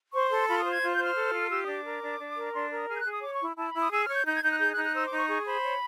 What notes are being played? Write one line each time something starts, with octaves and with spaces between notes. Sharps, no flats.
C5 C#6
A4 C6
F4 B5
D#6
C5
G#6
F4
G6
C5
F6
A4
F4
G4 E6
D4 D#6
D6
A#4
D4
D4
A#4
D4 C6
A#4
D#6
G#4 F6
G6
F#6
G#4
D#6
C#5 D6
C#6
E4
E4 A5
B5
E4
D#6
G#4 E6
C#5 F6
G6
D#4 G6
G#6
D#4 G6
F#6
G#4 G6
F#6
D#4
F#6
C5 E6
D6
D#4
C#6
G#4 C#6
C5 B5
C#5